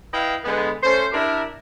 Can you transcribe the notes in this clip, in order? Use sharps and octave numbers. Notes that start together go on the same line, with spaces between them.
E4 B4 D#5 F5 G5
D3 G#3 B3
A3 C#4 C5
D4 E4 G4 A#4